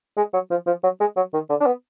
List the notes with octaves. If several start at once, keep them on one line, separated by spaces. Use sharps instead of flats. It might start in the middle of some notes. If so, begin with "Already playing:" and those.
G#3
F#3
F3
F3
F#3
G#3
F#3
D#3
D3
D4
B3